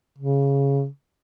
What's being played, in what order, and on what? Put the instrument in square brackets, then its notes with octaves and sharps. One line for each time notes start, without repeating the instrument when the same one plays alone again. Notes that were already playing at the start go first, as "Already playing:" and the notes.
[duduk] C#3